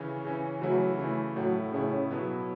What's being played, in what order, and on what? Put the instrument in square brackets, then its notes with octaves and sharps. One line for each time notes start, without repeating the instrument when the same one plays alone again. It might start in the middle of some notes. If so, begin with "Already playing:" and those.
Already playing: [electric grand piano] C#3 E3 C#4
C#3 E3 C#4
[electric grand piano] C#3 E3 A3 E4 [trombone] F#3
[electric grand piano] C#3 E3 A3 E4
[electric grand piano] A2 A3 E4 [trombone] F#3
[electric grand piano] A2 A3 E4 [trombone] C#3
[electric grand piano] B2 F#3 B3 E4